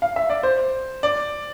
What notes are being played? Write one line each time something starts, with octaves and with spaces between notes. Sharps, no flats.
F5
E5
D5
C5
D5